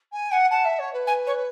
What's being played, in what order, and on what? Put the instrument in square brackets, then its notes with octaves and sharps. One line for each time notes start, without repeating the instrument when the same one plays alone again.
[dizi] G#5
[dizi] F#5 [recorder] G#5
[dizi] F#5 [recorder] A5
[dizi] E5
C#5
B4
[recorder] G#5
C#5